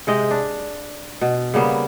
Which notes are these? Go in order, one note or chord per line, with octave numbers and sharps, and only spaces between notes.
C3 G#3 D#5 G5
D4
B2
C#3 G3 A#3 B3